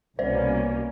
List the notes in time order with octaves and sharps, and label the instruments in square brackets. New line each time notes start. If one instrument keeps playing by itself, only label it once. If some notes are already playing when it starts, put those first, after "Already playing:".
[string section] C2 B2 G3 A#3 C#4 [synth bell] C5 D5